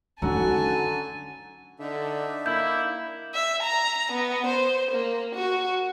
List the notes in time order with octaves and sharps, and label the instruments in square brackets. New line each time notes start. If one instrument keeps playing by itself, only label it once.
[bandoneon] D3 [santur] F#3 F#5 [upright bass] C#4 D#4 [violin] G#5 A5
[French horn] D3 [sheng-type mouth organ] D4 D#4 E5
[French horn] A#3 [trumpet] E4 [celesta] G6
[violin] E5
A#5
B3
C5
A#3
F#4